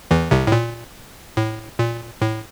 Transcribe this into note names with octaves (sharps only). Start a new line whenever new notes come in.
E2 E3
C2 C3
A2
A#2
A2
A#2
A2